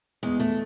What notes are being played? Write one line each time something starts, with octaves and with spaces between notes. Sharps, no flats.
E2 G#3
A3